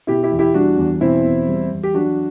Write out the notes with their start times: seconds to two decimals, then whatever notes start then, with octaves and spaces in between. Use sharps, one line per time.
0.07 B2 E4 G4
0.23 E4 G4
0.31 E2
0.39 E4 G4
0.54 G3 D4 F#4
0.77 E2
1.01 B2 C4 E4
1.24 E2
1.48 G3
1.71 E2
1.83 G4
1.94 F#3 D4 F#4